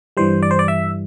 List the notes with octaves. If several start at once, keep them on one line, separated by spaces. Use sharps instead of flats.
G2 E3 G3 C5
D5
C5
D5
E5